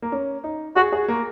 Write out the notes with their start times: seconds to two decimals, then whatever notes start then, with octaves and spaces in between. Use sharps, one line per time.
0.02 A#3
0.12 C#4
0.44 D#4
0.76 F#4 G#4
0.93 G#4
1.08 A#3